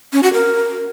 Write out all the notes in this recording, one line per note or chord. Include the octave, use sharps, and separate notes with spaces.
C#4
F#4
A#4